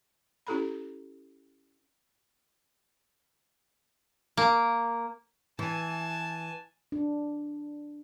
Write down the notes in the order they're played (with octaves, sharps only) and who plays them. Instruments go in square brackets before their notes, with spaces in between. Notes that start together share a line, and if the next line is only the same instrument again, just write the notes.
[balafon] C#4 E4 G4 A4 A#5 B5
[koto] A#3
[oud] E3 [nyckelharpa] G#5 A5
[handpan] D4